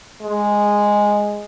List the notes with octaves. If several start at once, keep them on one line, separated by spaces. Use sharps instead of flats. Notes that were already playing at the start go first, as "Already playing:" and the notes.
G#3